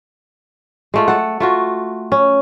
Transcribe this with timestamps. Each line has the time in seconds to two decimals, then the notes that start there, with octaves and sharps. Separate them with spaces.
0.94 G#3 A3 F4
1.08 A4 F#5
1.40 A3 F4 F#4
2.12 C#4